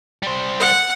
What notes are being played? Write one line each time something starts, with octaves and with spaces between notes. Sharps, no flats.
G3 C5
F#5